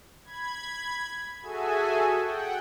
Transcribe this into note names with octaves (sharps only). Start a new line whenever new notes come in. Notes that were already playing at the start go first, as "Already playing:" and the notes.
B5 G#6
F#4 G#4 A4 E5 G#5
F#5 G5